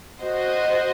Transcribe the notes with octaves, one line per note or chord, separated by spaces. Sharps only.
F#4 C5 D#5